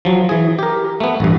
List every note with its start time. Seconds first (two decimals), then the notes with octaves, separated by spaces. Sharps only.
0.05 F3 F#3
0.29 E3 G#4
0.59 G4 A#4
1.00 A3 B3
1.20 A1 G2